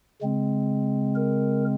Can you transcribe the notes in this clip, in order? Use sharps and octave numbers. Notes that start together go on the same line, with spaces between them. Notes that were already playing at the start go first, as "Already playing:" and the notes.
C#3 G#3 C4
A#4